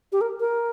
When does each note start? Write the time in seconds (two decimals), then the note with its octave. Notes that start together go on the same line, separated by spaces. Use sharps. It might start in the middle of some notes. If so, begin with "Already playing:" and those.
0.12 G4
0.21 A#4
0.40 A#4